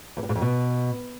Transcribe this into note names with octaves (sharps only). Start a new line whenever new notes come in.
E2
G2
G#2
F2
B2